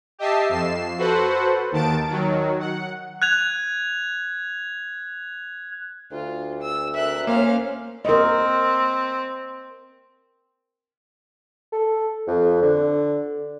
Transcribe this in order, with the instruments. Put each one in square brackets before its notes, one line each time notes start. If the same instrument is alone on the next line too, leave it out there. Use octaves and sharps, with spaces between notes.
[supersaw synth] G4 D#5 E5 A5 C7
F2 C7 E7
F#4 A4 B4 C5 F#5
D#2 D#3 A5 A6 D7
D#3 F#3
F#5
[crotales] F#6 G#6 F7
[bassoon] D2 [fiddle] F4
[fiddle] E6
[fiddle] A#4 F#6 [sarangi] E5
[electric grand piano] A#3 [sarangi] C#4 [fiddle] C5 F5
[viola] C4 [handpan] A#4 D#5
[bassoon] A4
F2
D3